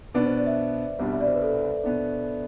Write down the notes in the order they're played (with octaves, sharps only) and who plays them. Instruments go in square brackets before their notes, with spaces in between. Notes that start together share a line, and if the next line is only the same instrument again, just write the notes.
[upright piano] B2 B3 D4 [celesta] B4
[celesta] C5
D5
E5
[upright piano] C2 B2 G3 D4
[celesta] E5
D5
C5
B4
A4
[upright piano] B2 B3 D4